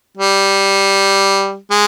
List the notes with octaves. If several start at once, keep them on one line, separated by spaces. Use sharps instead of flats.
G3
G#3